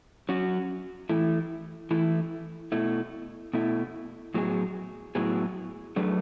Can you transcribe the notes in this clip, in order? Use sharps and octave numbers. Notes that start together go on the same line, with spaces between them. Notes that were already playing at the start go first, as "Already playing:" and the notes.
F#3 C#4 F#4
E3 A3 E4
E3 A3 E4
B2 A3 E4
B2 A3 E4
A2 F#3 B3 E4 G#4
A2 F#3 B3 E4 G#4
F#3 A3 D4 G#4 B4